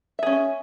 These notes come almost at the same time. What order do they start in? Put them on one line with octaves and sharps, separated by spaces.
E5 G#4 C#4